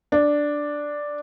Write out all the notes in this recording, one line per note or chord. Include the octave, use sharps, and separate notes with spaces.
D4